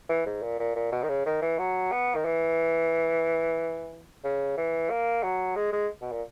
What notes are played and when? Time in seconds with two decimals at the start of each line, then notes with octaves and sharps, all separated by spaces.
0.09 E3
0.26 G#2
0.43 A#2
0.59 A#2
0.76 A#2
0.92 B2
1.03 D#3
1.09 C#3
1.26 D#3
1.42 E3
1.59 F#3
1.92 B3
2.15 D#3
2.25 E3
4.24 C#3
4.57 E3
4.90 A#3
5.23 F#3
5.56 G#3
5.73 G#3
6.01 B2
6.12 A#2